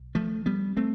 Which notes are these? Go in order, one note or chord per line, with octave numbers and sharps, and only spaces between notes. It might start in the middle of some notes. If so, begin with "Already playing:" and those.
Already playing: B1
F3 A3
G3 B3
A3 C4